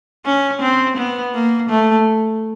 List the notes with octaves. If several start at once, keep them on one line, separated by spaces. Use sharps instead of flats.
C#4
C4
B3
A#3
A3